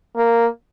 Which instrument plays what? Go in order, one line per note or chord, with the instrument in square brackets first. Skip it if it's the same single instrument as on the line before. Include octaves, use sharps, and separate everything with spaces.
[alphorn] A#3